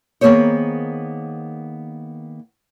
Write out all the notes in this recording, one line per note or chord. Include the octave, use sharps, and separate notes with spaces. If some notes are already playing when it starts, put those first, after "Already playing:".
D#3 A#3 B3 G#4 C5 C#5